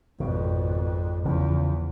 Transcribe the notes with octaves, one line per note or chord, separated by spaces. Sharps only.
G#1 F2 B2
E2 C#3 F3